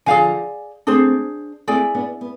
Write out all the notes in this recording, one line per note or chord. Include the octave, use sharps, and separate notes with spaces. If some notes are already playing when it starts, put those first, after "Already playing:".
D3 F3 G#4 D5 F5 G#5
A3 C4 D4 G#4 C5
A3 C4 E4 G#4 D5 G#5
B3 D4
B3